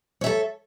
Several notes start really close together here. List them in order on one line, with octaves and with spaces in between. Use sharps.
C#5 E5 A4